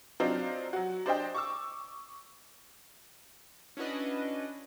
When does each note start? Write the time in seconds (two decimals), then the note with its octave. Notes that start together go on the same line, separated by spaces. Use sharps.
0.20 F#3 C4 D4 D#4 F4
0.73 F#3 F#4
1.06 D4 C5 D#5 G5
1.34 C#6 D6 E6
3.77 C#4 D4 E4 F#4 B4 D#5